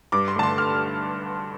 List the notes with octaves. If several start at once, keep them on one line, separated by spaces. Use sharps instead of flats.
G2 D6
C6
D3 A3 A5
C6
F6